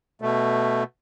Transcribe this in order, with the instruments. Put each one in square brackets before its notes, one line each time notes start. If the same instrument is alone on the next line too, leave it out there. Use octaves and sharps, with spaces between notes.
[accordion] B2 A3